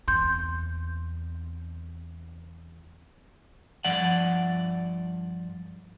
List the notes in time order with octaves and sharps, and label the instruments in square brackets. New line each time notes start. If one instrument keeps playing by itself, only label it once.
[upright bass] E2 C4 [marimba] C6 G6
[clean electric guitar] G2 F3 D5 F#5